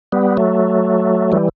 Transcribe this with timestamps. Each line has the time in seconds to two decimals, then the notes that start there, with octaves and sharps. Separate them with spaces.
0.12 G3 B3
0.37 F#3 A3
1.32 E3 G3